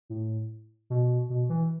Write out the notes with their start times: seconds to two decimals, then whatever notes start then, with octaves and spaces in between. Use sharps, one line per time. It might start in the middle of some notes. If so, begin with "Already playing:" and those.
0.09 A2
0.90 B2
1.30 B2
1.49 E3